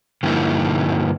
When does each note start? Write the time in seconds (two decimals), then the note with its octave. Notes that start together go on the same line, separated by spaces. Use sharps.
0.23 G2 D3 F3 A#3 D#4 E4